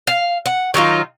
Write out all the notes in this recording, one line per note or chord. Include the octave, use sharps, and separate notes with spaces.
F5
F#5
D#3 F#3 D#4 F4